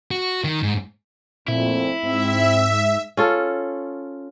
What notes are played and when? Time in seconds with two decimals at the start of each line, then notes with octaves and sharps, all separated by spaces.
0.11 F#4
0.44 D#3
0.63 G#2
1.48 F2 A#2 A3 C4 E4
2.03 G#2 C4 E5
3.17 C#4 F4 A4